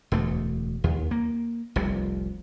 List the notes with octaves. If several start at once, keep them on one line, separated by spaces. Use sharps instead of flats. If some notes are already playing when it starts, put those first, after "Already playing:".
E1 D2 A3
D#2
A#3
F1 C2 C3